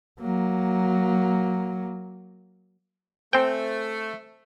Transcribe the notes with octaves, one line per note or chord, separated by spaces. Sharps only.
F#3 A#3
A3 C4 C5 G5 G#5